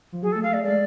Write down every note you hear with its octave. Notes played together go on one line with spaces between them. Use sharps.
F3
F#3 G#4
A4
A3
F5
A3
D5
G#3 D5